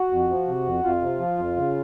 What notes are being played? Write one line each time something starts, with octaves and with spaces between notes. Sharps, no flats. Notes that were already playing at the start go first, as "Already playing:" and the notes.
Already playing: F#4
F2
F3
C3
F2
F2 F4
C3
F3
F2
C#3